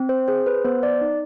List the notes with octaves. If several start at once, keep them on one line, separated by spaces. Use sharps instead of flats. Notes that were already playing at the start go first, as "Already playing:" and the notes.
Already playing: C4
C5
G#4 C5
B4
B3 C5
D5
D#4